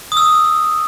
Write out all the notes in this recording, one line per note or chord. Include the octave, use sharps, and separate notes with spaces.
D#6
E6
D#6